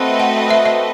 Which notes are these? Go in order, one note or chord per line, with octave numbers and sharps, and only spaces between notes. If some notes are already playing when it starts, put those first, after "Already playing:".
Already playing: A3 C4 F#4 B4 D#5
F#5
E5
E5